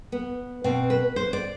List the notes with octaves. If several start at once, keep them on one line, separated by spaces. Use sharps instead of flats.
B3
B2 C4
B4
C5
D5